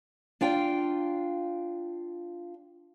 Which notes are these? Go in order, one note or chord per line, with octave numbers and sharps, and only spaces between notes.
D4 F4 F5 G5